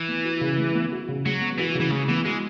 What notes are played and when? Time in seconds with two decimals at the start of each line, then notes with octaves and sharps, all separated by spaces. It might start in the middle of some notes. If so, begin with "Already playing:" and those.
Already playing: E3
0.08 B3
0.24 F#4
0.41 C#3
0.58 G#3
0.74 B3
0.92 F#4
1.08 C#3
1.25 F#3 G#3
1.41 B3
1.58 E3 F#4
1.75 C#3
1.81 E3
1.91 C#3 G#3
2.08 E3 B3
2.25 G#3 F#4